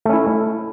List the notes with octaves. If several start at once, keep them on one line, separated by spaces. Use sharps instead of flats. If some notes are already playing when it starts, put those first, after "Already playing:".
A3 C#4 E4